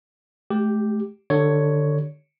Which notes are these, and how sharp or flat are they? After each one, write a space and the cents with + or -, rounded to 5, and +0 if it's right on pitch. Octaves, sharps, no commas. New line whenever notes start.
A3 -40 G4 +0
D3 +20 G4 +0 C#5 +5